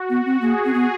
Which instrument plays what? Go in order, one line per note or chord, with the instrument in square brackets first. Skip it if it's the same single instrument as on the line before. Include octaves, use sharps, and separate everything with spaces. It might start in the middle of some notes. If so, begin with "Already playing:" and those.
Already playing: [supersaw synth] F#4
[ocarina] B3
C4
[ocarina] A#3 [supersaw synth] G#4
[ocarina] C4
B3